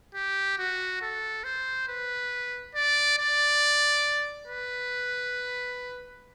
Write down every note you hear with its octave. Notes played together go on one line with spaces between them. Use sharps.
G4
F#4
A4
C5
B4
D5
D5
B4